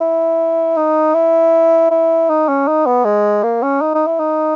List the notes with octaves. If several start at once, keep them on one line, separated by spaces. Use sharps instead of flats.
E4
D#4
E4
E4
D#4
C#4
D#4
B3
G#3
A#3
C#4
D#4
D#4
E4
D#4